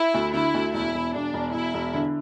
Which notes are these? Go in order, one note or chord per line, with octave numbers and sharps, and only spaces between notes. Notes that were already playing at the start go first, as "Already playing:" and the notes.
Already playing: E4
D2
D3 E4
D2
E1 E4
E1
E1 D4
E1
E1 E4
E1
D3